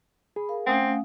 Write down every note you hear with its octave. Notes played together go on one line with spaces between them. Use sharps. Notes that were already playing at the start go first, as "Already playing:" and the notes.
G#4 B5
A#4 F5
A3 C4 C#4 F5 F#5 G#5 D#6